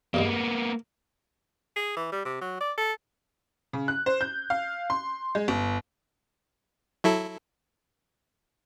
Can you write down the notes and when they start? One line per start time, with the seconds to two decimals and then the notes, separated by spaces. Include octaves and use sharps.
0.14 E2 G2 G#3 A#3 B3
1.76 G#4
1.96 E3
2.12 G3
2.25 C3
2.41 F#3
2.60 D5
2.78 A4
3.73 C#3
3.88 F#6
4.06 C5
4.21 G6
4.50 F5
4.90 C6
5.35 G#3
5.48 G1
7.04 F#3 E4 A4